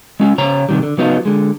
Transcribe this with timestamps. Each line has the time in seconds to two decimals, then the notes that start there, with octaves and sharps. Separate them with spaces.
0.20 G#3 C#4 F4
0.38 C#3 C#5 A#5
0.69 C3 D#3 G3
0.83 D3
0.97 C#3 F#3 B3 D#4 F4
1.26 D3 G#3